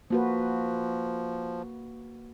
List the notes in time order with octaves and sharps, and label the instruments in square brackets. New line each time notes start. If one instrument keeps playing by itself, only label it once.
[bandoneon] F3 [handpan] A#3 F#4 B4